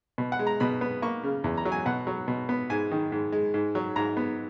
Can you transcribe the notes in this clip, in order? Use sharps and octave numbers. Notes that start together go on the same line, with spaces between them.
B2
F#5
G#3
A#5
B2 B5
B3
A#3 C#6
C#3
E2
A#5
F#3
G#5
B2 F#5
F#3
B2
B3
G#2 G#5
D#3
G#2
G#3
G#2
F#3
G#2 A#5
B3